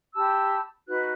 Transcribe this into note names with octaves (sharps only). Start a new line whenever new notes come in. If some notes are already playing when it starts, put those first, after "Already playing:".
G4 A5 B5 E6
D#4 F#4 B4 F#6